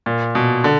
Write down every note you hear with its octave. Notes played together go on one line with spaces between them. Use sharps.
A#2
B2
D3